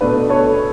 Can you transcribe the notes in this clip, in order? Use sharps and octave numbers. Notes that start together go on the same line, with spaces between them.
B2 A3 D4 B4
A4 C#5